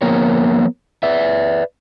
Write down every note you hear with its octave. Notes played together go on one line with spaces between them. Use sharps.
F3 A#3 B3 A#4 C5 C#5
B4 D5 E5